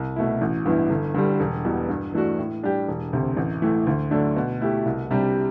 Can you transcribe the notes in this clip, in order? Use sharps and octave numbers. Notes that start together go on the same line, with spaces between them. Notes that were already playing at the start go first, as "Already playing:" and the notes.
Already playing: C2
B2 A3 E4
A1
G2 E3 B3 E4
G1
G2 D3 G3
E1
E2 B2 G3
G2
E3 A3 D4 F#4
A2
G3 D4 G4
E1
D2 C3
A1
A2 E3 A3
D2
D3 F#3 A3 D4
B2
A3 E4 G4
C2
C3 G3 D4 G4